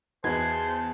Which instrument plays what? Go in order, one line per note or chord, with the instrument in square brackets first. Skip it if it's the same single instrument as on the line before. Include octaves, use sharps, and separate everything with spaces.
[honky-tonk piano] E2 G#6 [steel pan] D#4 F#4 B4 [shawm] C5 [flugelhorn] A5